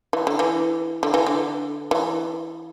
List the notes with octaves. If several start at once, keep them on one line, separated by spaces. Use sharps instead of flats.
E3
D3
E3
D3
E3
D3
E3